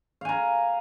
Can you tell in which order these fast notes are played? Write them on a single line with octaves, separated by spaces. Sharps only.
F5 G#5 A#5